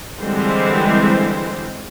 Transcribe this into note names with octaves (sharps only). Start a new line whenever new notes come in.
D3 E3 G3 G#3 C4 C5